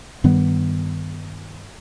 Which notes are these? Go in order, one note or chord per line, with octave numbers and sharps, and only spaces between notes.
G2 D#3 G3 B3